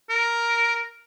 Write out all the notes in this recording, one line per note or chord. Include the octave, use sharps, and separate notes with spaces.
A#4